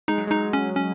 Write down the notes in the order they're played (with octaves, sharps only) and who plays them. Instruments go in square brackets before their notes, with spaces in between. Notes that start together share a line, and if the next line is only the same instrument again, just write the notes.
[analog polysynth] G#3 [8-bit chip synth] D#4
[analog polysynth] F#3
[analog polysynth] G#3 [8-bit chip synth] D#4
[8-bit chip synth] C#4
C#4